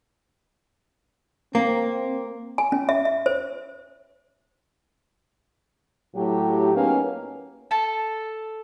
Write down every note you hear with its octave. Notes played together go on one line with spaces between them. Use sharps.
A#3 C4
G#5
C#4
E5
E5
C5
A2 F#3 G4
A#3 B3 C#4 D#4 G#4 B4
A4 A5